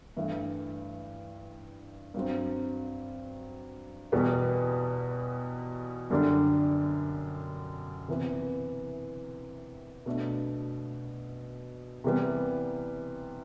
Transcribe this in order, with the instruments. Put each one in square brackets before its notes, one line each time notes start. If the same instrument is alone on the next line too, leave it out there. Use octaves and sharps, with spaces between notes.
[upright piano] G2 E3 A3 E4
G2 F#3 C4
E2 B2 G3 B3
F#2 D3 G3 D4
C3 E3 B3 E4
B2 A3 D4
C3 E3 G3 B3